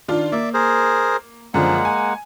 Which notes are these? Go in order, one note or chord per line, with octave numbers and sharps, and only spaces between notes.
D#3 D4 F4
A#3 D5 E5
G#4 A#4 C5
F#2 D3 F3 G#3 A#3 F#5
G#5